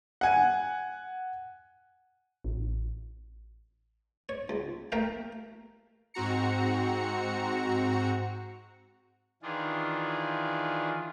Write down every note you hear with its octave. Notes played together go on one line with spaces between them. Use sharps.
F#5 G#5
A1
C#5
C#2
A3 A#4 E5 F5 G5
G#2 C4 F#4 A#5 C#7
D#3 E3 D4 F4 G#4